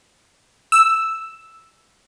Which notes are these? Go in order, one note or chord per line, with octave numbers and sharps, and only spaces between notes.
E6